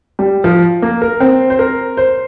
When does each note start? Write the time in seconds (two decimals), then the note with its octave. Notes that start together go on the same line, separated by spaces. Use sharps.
0.19 G3
0.44 F3
0.82 A#3
1.02 A#4
1.20 C4
1.50 C5
1.59 A#4
1.97 C5